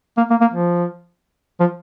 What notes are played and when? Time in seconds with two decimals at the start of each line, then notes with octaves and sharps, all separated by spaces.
0.18 A#3
0.30 A#3
0.41 A#3
0.53 F3
1.60 F3